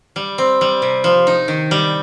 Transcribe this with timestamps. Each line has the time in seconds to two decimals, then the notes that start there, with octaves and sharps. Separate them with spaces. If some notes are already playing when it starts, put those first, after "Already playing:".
0.16 G3
0.38 C4
0.61 G3
0.82 C3
1.04 F3
1.27 D#4
1.48 D#3
1.71 G3